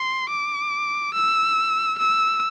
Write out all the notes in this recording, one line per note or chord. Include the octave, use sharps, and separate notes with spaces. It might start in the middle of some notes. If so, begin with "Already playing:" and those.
Already playing: C6
D6
E6
E6